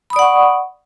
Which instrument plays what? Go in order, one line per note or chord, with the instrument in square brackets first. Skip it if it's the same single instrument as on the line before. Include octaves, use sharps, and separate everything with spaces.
[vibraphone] B5
D#6
D5
F#5
C#6